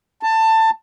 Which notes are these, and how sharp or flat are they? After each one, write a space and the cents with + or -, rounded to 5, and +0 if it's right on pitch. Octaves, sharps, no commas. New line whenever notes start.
A5 +20